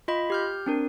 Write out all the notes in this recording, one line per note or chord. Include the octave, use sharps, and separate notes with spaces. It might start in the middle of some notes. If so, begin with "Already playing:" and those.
F4 D#5 B5
G4 F6 G6
C4 D4 A#4